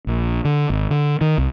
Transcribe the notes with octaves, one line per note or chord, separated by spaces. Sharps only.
A#1
D3
G#1
D3
D#3
C2